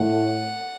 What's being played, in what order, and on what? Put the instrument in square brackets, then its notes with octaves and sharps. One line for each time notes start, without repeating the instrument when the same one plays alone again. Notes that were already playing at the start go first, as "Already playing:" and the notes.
Already playing: [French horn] A2 [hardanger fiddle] F#5